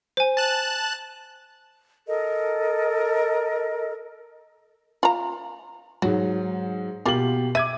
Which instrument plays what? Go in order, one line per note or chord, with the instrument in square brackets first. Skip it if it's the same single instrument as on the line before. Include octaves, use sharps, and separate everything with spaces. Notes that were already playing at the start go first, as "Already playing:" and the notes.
[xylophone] C5 G#5
[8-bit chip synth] A5 F#6
[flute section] A4 A#4 D#5
[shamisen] F4 A#5
[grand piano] G#2 F#3 [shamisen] F#4
[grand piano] B2 G4 F#7 [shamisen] A#3 F4
[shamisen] E5 [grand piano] D6 G#6 D#7